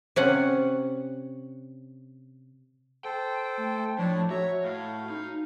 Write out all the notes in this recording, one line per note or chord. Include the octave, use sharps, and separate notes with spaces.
C3 C#4 F#5
A4 C5 G5
A3
A2 F3 D4 C#5 A5
F#4 C#5 E5 A#5
A2 F5
D#4